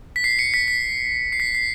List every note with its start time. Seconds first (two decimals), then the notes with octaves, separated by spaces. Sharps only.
0.16 B6
0.24 C7
0.39 C#7
0.54 B6
0.68 B6
1.32 C7
1.40 B6
1.55 C7